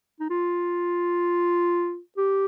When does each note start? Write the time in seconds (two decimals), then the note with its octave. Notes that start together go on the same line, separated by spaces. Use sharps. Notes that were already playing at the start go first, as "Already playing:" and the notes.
0.20 D#4
0.30 F4
2.17 G4